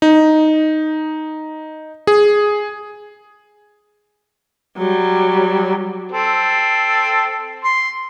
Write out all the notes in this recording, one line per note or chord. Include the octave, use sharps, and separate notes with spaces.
D#4
G#4
F#3 G3
C4 A4
C6